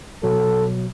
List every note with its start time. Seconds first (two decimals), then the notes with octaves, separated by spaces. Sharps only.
0.23 B2 F#3 A4